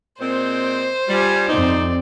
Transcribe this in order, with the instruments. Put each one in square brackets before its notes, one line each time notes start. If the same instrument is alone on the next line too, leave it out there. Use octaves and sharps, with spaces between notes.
[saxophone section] A#2 G#3 C4 [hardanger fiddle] C5
[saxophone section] G3 [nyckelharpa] F4 G#5
[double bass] F2 C4 [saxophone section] D#4 [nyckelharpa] D5